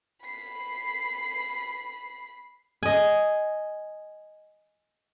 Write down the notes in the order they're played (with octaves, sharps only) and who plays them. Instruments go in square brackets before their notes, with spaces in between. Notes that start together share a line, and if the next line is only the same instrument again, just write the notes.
[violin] B5 C7
[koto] D#5 G#5